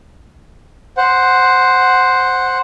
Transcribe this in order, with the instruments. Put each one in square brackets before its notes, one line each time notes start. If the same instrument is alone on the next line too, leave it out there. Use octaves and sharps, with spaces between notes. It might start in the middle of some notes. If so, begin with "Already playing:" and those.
[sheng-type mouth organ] C5 F#5